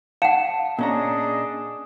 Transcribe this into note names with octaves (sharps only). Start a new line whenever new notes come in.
F5 F#5 A5 C#7 E7
A#2 C#4 D4 G#4 D#5 A#5